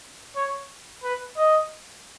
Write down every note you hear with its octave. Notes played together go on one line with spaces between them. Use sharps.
C#5
B4
D#5